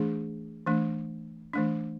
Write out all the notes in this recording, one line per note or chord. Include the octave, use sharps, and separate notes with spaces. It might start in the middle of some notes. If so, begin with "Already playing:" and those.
Already playing: E3 A3 D4 G#4
E3 A3 D4
E3 A3 D4